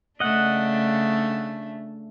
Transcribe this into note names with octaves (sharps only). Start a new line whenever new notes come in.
C#3 A3 D4 D#5 F#5